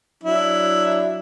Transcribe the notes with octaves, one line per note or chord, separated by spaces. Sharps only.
F#3 D4 E4